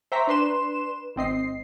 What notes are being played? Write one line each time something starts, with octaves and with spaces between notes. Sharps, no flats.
C5 E5 G5 A#5 C#6 B6
D4 B4 C6 E7
G#1 C4 D#5 C7